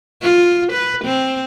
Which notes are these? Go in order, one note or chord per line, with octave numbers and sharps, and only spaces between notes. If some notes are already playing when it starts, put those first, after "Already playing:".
F4
B4
C4